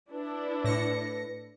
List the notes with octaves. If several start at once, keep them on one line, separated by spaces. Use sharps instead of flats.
D4 E4 B4
A2 A#6 C#7